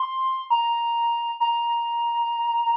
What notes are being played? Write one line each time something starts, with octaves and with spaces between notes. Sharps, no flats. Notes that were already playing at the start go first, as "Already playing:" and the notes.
Already playing: C6
A#5
A#5